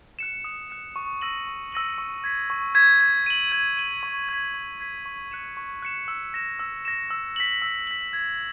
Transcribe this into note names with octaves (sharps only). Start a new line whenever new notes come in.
F#6 C#7 E7
D#6
F#6 C#7 E7
C#6
E6 A#6 D#7 F#7
C#6
E6 A#6 D#7 F#7
C#6
G#6 B6
C#6
G#6 B6
G#6
D#7 F#7
G#6
D#7 F#7
C#6
G#6 B6
C#6
G#6 B6
C#6
F#6 C#7 E7
C#6
F#6 C#7 E7
E6
A#6 E7
E6
A#6 E7
E6
B6 F#7
E6
B6 F#7
G#6